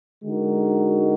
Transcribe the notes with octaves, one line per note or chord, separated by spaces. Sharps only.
D3 G#3 D#4 F#4 A#4